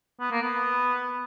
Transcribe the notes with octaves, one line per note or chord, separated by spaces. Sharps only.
B3
A#3
B3